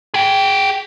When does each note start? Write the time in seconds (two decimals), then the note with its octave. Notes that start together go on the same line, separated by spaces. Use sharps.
0.14 G#4 G5